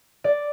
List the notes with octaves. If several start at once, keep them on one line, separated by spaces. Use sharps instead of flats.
D5